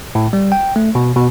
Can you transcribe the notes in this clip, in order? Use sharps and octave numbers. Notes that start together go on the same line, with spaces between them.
A2
G3
G5
A3
B2
B2